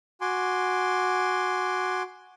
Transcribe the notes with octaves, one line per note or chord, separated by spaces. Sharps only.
F#4 G#5 C6 D6